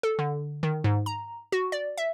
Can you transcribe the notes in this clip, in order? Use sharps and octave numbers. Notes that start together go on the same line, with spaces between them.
A4
D3
D#3
G#2
A#5
F#4
D5
E5